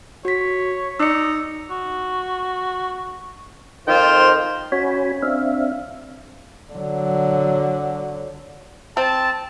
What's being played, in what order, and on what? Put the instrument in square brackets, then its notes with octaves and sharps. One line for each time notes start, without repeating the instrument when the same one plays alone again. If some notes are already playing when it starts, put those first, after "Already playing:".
[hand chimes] F#4 B6 [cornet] C#5
[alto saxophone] D#4 [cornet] D5 [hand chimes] E6 C#7
[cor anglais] F#4
[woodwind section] F2 D#3 [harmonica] F4 C5 [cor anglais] G5
[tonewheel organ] C#4 F#4 C#5 G#5 B5
C4 D4 E5 F5
[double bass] D3 F#3
[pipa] C4 [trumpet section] A5